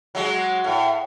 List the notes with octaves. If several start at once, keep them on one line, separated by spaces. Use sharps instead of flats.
F#3 G#3 F#4
A2